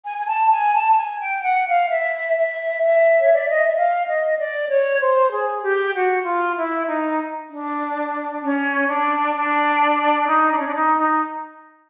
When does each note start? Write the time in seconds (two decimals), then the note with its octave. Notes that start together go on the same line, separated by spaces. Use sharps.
0.04 G#5
0.18 G#5
0.27 A5
0.51 G#5
0.74 A5
0.93 A5
0.97 G#5
1.20 G5
1.43 F#5
1.67 F5
1.90 E5
2.37 E5
2.84 E5
3.20 C#5
3.35 D5
3.49 D#5
3.63 E5
3.77 F5
4.07 D#5
4.38 D5
4.69 C#5
5.01 C5
5.32 G#4
5.63 G4
5.94 F#4
6.25 F4
6.56 E4
6.87 D#4
7.50 D4
8.42 C#4
8.89 D4
9.36 D4
10.28 D#4
10.51 D4
10.59 C#4
10.67 D4
10.75 D#4
10.98 D#4